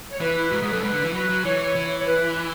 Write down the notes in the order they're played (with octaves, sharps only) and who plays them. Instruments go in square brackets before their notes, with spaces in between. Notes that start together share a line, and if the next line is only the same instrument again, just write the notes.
[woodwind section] C#5
[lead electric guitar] E3 [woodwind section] B4
[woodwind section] E4
[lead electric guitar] G#2 [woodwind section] F#4
[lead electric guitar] G#2 [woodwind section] G#4
[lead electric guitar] F#2 [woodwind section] A4
[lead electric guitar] G#2 [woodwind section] B4
[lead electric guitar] D3
E3
[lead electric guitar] F#3 [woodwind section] B4
[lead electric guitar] F#3
[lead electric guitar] E3 [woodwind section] C#5
[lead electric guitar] E3
[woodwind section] C#5
B4